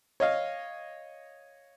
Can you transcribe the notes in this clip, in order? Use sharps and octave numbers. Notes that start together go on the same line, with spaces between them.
C#5 D#5 F5